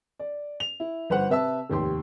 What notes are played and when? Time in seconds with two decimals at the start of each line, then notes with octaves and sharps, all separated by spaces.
0.19 D5
0.60 F7
0.80 E4
1.10 G1 B4 C5 F#5
1.29 C3 B4 E5 A5 E6
1.70 F1 D#2 G4 C6